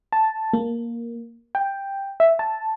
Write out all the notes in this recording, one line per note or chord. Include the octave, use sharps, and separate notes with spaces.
A5
A#3
G5
E5
A5